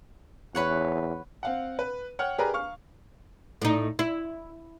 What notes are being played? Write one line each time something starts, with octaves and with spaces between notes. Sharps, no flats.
E2 B4 C#5 F#5
C4 F5 F#5
B4
C#5 F#5 G5 F6
G4 G#4 A#4 B4 D5 A#5
F5 C#6 F6
A2 D#4
E4